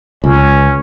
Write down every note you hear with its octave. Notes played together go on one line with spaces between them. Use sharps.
C#2 C#4